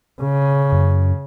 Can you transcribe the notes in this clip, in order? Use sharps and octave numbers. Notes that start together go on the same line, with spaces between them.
C#3
F#2